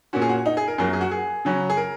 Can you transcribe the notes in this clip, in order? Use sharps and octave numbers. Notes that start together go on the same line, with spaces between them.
A#2 A#3 C#4 F#4
G#4
F#4
D#4
G#4
A#4
F#2 F#3 A#3 G#4
G#4
F#4
G#4
C#3 F#3 C#4
G#4
A#4